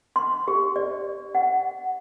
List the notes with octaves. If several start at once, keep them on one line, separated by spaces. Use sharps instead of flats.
C6
G4
D5
F#5